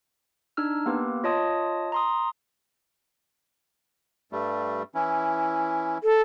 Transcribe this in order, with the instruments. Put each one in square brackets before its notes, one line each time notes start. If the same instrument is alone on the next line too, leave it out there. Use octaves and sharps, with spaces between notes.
[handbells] D4 D#4 E6 F6
A#3 B3 G4 B4
F4 C#5 D#5 A5 D#6
A#5 C6 D#6
[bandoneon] G2 G3 A3
E3 C#4 E4
[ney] A4